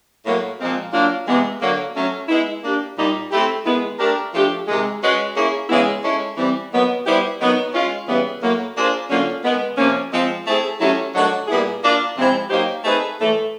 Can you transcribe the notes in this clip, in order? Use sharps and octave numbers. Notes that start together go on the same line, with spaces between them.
A2 F#3 A#3
A#2 F3 G#3 C4 F4
F#3 A#3 D4 F4
C3 E3 G#3 B3
D3 F#3 A#3
F#3 A3 C#4
G#3 B3 E4
A#3 D4 G4
A#2 G3 A#3 D#4
A3 C4 E4 G4
D#3 G#3 B3 E4 G#4
A3 D4 G4 A#4
F3 A3 D4 G4
C3 D#3 G#3
G#3 C#4 F#4 B4
A#3 C#4 E4 G#4
C#3 E3 G#3 B3 E4
G#3 C#4 E4 A4
E3 G3 C4
D#3 F#3 B3
G3 B3 E4 G4 C5
D#3 F#3 B3 D#4
G#3 C#4 F4
C#3 E3 G3 B3
A2 F#3 A#3
A#3 D4 F4 G#4 C5
D3 F#3 A#3 C#4 F4
D#3 G#3 B3
C3 F3 A#3 C#4
F3 G#3 C4
A3 C4 E4 G#4
F#3 A3 C#4 E4 G4
D#3 F#3 A3 D4 F#4
A#2 G3 B3 E4 G#4
A#3 D4 F4
C3 F3 G#3 C4 E4
F#3 A#3 D#4 G4 C5
A3 C4 D#4 G#4 B4
A2 E3 A3